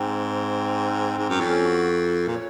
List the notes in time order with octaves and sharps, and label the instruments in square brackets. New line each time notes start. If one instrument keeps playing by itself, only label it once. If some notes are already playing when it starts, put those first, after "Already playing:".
Already playing: [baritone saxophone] G#2 [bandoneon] C4
[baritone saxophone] G#2
F#2
[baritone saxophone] F2 [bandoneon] C#4
[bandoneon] F#4
[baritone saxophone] A#2
[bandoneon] C#5